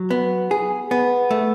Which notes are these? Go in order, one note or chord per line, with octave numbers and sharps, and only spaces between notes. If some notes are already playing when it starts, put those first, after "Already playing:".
Already playing: F#3
B3
G#4
B3
A3